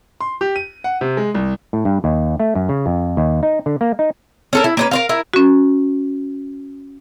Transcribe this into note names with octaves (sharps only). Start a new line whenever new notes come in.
C6
G4
D#7
F#5
C3
G#3
C2
A2
G2
D#2
A3
F#2
C#3
F2
D#2
D#4
D3
A#3
D#4
C#4 A4 A#4
E4
A#3 C#4 B4
A#4 C5 F5
E4 A#4
C#4 F#4